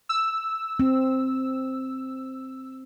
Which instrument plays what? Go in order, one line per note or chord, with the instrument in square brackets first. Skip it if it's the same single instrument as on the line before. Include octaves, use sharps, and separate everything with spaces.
[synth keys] E6
[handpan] C4